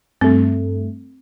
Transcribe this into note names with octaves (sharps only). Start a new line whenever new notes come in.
G2 A3 C4